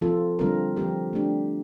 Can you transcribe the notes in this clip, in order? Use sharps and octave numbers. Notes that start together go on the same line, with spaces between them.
F3 C4 F4 A4
D3 G3 C4 F4 A#4
F3 C4 G4 A#4
A3 D4 G4